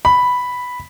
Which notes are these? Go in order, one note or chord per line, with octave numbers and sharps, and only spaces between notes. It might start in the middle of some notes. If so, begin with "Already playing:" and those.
B5